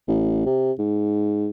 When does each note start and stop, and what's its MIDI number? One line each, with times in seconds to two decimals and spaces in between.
0.08 0.45 33
0.46 0.72 48
0.79 1.50 44